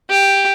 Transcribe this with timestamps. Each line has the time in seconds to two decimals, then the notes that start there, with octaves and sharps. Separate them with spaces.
0.10 G4